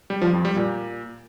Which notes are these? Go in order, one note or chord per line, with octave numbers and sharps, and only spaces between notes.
G3
F3
F2
G3
A#2